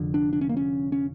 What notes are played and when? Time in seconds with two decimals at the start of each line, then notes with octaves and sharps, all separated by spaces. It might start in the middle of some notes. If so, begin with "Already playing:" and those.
Already playing: F1 F2 D3
0.14 D4
0.33 D4
0.41 C#4
0.49 A#3
0.57 C#4
0.92 C#4